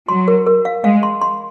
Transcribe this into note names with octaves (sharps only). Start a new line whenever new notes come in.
F#3 C6
A#4
A#4
F5
G#3 F5
C6
C6